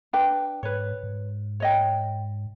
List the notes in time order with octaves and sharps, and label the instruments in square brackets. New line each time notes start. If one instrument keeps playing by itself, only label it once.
[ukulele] D4 B4 G5
[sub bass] G#2 [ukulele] B4 C#5
[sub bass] G#2
[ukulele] C#5 D#5 G5